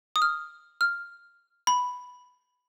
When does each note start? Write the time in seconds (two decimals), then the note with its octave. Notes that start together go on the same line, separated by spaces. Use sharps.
0.16 D#6
0.22 F6
0.81 F6
1.67 B5